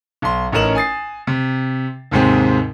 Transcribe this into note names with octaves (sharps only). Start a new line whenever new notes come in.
B1 C6
A1 C#4 D#4 A#4 E7 F#7
G#5 D#6 A6 C7
C3
D#2 G#2 C3 G#3 C4